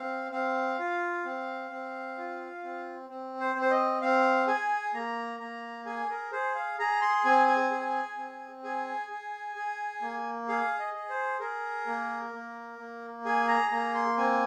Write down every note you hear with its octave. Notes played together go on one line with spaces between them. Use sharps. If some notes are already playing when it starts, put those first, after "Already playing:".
Already playing: C4 F5
C4 F5
F4
C4
C4
F4
C4
C4
C5
C4
C5
D#5
C4 F5
G#4 G#5
A#3 A#5
A#3 A#5
G#4 G#5
A#4
G#4 C5
F5
G#4 A#5
C6
C4 G#5
G#5
G#4
C4
G#4 G#5
G#4
G#4
A#3
G#4 F5
D#5
G#4
C5
G#4 A#4
A#3
A#3
A#3
G#4 G#5
A#5
A#3 A#5
C6
C4 G#5